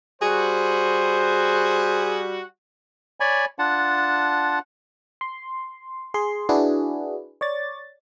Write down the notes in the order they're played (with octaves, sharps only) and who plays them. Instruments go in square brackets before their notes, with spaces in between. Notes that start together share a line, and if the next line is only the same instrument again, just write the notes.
[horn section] G3 F#4 [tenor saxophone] G#4 [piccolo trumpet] C5
[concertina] C#5 D5 G#5 B5
D4 F4 F#5 A5
[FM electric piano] C6
G#4 C6
D4 E4 F#4 G#4 B4
C#5 D5 A6